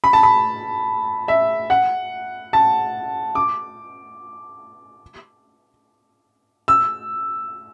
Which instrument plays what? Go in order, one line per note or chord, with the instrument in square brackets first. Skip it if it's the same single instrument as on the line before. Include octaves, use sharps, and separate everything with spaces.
[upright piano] B5
A5
B5
E5
F#5
A5
D6
E6